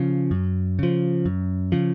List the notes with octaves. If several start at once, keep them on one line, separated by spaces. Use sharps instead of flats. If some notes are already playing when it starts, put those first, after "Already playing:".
Already playing: C#3 F3
F#2
C#3 F3
F#2
C#3 F3